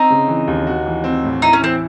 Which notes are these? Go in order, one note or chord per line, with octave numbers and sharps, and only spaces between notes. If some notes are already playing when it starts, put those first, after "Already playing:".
Already playing: C4 D#4
C#3
E3
D#2
F#4
E3
C4
A2
D#4 E4
C#4
E3 C4